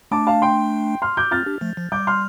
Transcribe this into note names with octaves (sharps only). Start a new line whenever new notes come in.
A3 D4 A5 D6
F5 A5
G5 C6
C6 F6
D6 G6
C4 F4 F6 A6
D4 G4
F3 A3
F3
G3 D6 G6
C6 F6